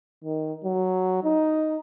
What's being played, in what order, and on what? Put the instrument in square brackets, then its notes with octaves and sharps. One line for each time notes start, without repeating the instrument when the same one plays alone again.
[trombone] D#3
F#3
D#4